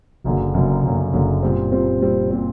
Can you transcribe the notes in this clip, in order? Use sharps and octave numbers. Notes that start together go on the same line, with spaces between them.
F#1 F#2 D3 F#3 A#3
F#1 F#2 D3 F#3 A#3
F#1 F#2 D3 F#3 A#3
F#1 F#2 D3 F#3 A#3
A#2 G3 C4
A#2 G3 C4
A#2 G3 C4
A#2 G3 C4